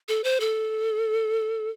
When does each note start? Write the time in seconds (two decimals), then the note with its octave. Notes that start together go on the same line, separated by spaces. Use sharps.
0.08 A4
0.24 C5
0.40 A4